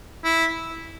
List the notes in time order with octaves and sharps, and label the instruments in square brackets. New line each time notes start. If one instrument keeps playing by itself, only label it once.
[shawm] E4